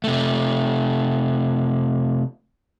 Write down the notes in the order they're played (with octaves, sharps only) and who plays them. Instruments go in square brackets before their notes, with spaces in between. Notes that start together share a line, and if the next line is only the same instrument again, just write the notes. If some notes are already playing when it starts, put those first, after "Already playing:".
[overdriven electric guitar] C3 A3